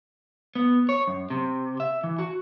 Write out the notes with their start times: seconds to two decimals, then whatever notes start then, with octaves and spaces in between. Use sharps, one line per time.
0.55 B3
0.89 C#5
1.07 F#2
1.30 C3
1.80 E5
2.04 E3
2.19 F#4